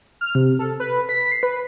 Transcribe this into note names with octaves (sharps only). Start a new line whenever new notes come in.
F6
C3
A4
B4
B6
C7
B4